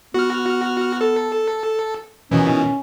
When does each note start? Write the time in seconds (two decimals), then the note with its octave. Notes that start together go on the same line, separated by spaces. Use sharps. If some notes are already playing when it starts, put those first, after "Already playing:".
0.14 B3 F#4 F6
1.01 A4
2.31 B2 D#3 E3 C#4